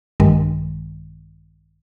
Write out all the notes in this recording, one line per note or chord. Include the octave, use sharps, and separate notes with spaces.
A#1 G2 D#3 G#3